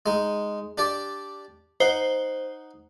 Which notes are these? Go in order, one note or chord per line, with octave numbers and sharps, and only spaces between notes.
G#3 D#4
D4 G4 D5
D#4 C5 F#5